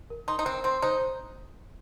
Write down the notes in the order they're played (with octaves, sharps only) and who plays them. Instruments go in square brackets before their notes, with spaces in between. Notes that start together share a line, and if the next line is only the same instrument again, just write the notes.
[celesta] A#4
[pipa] D#4 [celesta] C6
[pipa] D#4
[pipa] C4 [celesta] C5
[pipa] C4 [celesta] C6
[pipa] D#4 [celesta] C5